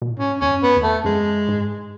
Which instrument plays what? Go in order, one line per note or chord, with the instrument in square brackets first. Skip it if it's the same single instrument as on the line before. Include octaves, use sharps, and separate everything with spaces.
[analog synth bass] B2
A2
[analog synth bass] G#2 [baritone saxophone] C#4
[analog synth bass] E2 [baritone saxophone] C#4
[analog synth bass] F#2
[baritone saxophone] B3
[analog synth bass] E2
[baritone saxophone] A3
[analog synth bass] F#2 [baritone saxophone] G#3
[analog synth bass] G#2